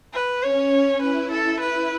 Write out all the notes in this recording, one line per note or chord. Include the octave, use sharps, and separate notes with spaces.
B4
C#4 C#5
E4 B4
A4
B4